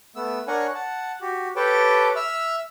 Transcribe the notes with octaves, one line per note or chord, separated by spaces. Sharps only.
A3 B3 E6
D4 A#4 C#5 F#5 G#5 C#6
F#5 A5
F#4 G4
G4 A4 B4 C#5 G5 A5
E5 E6 F6